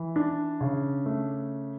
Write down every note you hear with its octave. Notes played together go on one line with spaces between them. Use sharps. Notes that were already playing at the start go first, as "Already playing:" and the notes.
Already playing: E3
D4
C#3
A3